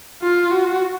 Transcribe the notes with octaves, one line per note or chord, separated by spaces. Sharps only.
F4
F#4